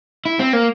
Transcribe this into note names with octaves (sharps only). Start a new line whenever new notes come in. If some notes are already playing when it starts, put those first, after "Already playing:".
E4
C4
A#3